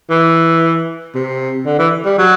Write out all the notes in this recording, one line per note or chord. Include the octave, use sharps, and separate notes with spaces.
E3
C3
D3
E3
G3
F#3